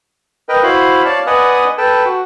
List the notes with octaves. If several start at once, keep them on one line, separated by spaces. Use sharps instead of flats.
A#4 B4 D#5 G5
E4 F#4 C5 F5 B5
C#5 D5 F5 A5
B4 D5 D#5 F#5 G#5 D#6
A4 B4 G5 A5
F#4